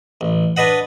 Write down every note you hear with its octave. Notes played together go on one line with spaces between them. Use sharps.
A1
D4 B4 D#5 F#5